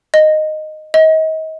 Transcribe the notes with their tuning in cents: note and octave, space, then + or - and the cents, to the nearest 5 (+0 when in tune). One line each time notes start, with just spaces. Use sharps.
D#5 -10
D#5 +35